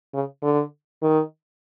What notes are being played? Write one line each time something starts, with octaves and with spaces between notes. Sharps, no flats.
C#3
D3
D#3